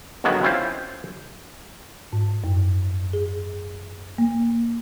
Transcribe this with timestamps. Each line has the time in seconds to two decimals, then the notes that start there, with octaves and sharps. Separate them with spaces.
0.24 G2 D3 D#3 F#3 G#3 B3
0.43 C4 C#4 E4 F4 C5
2.13 G#2
2.44 F#2
3.13 G#4
4.18 A#3